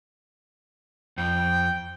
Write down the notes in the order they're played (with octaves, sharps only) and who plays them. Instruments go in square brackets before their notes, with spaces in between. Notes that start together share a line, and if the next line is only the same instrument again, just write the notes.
[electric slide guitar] F2 [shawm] G5